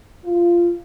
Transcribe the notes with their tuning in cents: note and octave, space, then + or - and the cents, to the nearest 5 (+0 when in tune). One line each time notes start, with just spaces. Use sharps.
F4 -15